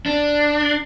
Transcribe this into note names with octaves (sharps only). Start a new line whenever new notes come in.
D4